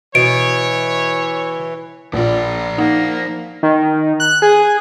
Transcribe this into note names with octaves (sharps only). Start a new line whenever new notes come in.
B2 E3 C#5 D7
A#1 F3 F4 D5
A#3 D#4 F#5
D#3
F#6
G#4